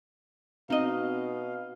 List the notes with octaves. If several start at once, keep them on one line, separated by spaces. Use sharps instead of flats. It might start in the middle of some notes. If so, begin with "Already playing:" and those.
B2 C4 D#4 D#5 F5